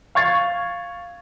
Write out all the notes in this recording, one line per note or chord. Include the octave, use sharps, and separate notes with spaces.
F5 C#6 G#6 A6 C7